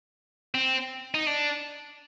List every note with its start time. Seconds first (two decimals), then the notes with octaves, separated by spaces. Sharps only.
0.55 C4
1.14 D#4
1.27 D4